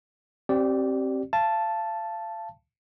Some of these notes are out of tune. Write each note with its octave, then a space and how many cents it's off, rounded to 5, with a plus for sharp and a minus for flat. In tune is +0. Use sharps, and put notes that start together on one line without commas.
C4 +25 G4 -20 D5 +0
F5 -35 A5 +0